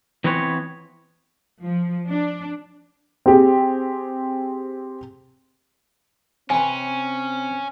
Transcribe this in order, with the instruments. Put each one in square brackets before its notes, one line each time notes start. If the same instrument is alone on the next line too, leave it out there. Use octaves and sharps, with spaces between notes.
[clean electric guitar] E3 B3 C4 B4 C#5
[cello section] F3
D4
[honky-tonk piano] C4 G4 G#4
[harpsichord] C3 B4 [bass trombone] C4 [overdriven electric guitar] C#4 [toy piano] G#5